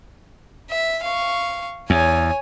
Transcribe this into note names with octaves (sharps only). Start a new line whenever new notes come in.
E5
F5 C#6
E2 C#5 G#5